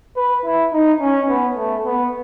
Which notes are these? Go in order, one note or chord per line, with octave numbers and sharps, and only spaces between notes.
B4
E4
D#4
C#4
B3
A3
B3